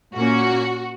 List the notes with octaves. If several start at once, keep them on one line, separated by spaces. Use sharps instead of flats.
A#2 A#3 C#4 F#4